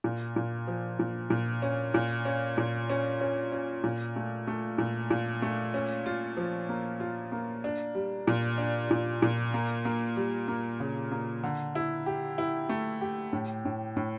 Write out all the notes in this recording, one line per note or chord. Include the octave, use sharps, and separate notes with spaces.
A#2
A#2
F3
A#2
A#2
C#4
A#2
C#4
A#2
C#4
C#4
C#4
A#2
A3
A3
A#2
A#2
A3
C#4
F4
F3
A#3
F4
A#3
D4
G3
A#2
D4
A#2
A#2
A#3
A#3
G3
A#3
C#3
A#3
D3
E4
G4
E4
A3
G4
A2
A2
A2